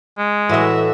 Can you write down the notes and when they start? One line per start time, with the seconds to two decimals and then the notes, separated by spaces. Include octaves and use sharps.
0.18 G#3
0.49 A2 E3 F#4 D#5 E5